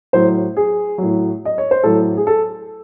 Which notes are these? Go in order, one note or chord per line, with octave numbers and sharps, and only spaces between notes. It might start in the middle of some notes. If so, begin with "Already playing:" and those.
A2 F#3 C5
G#4
A2 F#3
D#5
C#5
C5
A2 F#3 A4
G#4
A4